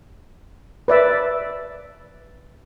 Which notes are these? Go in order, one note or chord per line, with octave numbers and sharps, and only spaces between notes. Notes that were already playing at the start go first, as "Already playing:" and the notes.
B4 D5 E5